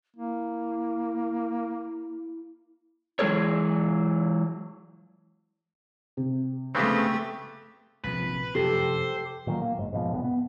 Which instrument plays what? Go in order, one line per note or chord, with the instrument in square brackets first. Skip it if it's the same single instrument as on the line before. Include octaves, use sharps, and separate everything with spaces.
[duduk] A#3 [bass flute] E4
[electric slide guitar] E3 F#3 G#3 G#4 A4 C#5
[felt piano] C3
[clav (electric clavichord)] C#3 B3 C4 [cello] A3 G4
[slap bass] A#1 C3 F3 [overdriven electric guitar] B4
[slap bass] F1 F#2 [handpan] G4 A4 [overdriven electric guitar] C5
[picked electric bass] A#2 D#3 F#3 A#3
A#3
F#1 G#2
G#2 B2 F3
F1 C2 C3 B3
B3